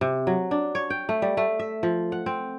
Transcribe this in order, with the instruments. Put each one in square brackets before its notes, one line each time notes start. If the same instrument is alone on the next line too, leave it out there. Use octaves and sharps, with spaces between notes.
[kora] C3
F#3
D4
C#5
G5
A3
G3
A3
E5
F3
F#5
C4